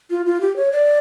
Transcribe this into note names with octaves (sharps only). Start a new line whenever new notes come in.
F4
F4
G4
C#5
D5